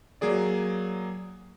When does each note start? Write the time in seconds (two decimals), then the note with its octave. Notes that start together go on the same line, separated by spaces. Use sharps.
0.21 F#3 A#3 G#4 D5